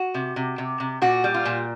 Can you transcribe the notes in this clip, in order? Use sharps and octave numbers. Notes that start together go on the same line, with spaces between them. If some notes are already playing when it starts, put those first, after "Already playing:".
Already playing: F#4
C3
C3
C3
C3
A#2 F#4
G3
F4
A#2